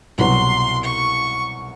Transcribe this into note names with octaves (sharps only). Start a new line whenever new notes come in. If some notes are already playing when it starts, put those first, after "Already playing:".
C2 B2 F#3 C6
C#6